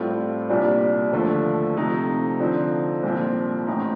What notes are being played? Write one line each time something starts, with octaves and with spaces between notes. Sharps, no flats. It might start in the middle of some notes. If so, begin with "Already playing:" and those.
Already playing: A2 G3 C4 F4 A4
C2 A#2 G3 D4 G4
D#2 D3 F3 A3
C3 F3 A3 D#4
D3 F3 C4 D#4
C2 A#2 F3 C4
A1 A2 A3 C4 D#4